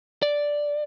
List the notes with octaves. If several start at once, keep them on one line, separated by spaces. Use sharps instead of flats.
D5